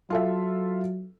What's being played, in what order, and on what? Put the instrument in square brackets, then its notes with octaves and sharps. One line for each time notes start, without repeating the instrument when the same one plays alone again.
[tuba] F#3 [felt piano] F4 A4 E5